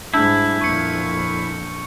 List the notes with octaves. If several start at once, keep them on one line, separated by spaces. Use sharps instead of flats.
G#2 G3 D4 E4 A5 E6 G6
F2 A#2 C#6 C#7